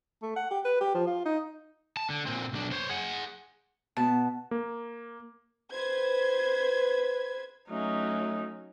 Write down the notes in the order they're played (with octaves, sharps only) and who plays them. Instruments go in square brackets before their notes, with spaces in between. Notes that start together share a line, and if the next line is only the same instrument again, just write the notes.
[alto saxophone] A3
F#5
G4
B4
G4
F3
F4
D#4
[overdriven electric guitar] A5
D3
A#2 C4
B1 D4
C5 C#5
G#4 F#5
[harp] B2 B3 [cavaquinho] A5
[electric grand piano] A#3
[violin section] B4 C5 G#6
[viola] F#3 C#4 [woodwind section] A3 [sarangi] D#4